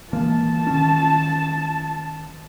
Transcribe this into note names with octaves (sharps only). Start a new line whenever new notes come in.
E3 G#3 A#3 A5
D#3 C#4